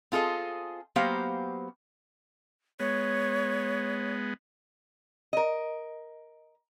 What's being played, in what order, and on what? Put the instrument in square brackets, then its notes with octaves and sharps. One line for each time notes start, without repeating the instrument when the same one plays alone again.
[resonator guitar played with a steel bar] C4 F4 G#4 A4 D#5
F#3 A#3 B3 G4 C5 F5
[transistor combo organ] G#3 B3 [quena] C#5
[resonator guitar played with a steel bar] A#4 D#5